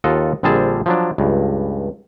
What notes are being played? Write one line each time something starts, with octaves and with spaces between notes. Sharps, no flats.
D#2 F4 A4 D#5 F#5
A#1 D3 G3 C4 G#4 A5
F3 F#3 D4
C#2 G2